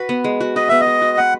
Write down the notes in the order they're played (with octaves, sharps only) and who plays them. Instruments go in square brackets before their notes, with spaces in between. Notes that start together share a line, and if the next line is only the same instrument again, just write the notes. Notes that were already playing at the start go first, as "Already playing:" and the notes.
Already playing: [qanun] F#4 B4
B3
G#3
F#4
[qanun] B4 [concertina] D#5
[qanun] B3 [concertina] E5
[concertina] D#5
[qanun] G#3
F#4
[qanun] B4 [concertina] F#5